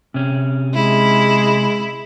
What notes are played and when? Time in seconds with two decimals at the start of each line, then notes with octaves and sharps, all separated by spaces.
0.14 C3 C#4
0.74 G#3 E4